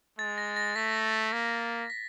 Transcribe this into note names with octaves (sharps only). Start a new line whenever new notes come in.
G#3 A6
A#6
A#6
A3 B6
A#3
B6